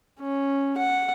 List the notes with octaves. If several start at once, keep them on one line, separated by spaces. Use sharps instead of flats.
C#4
F#5